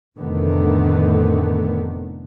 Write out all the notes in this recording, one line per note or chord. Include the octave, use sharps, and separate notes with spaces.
F1 A2 D3 D#3 A3 B3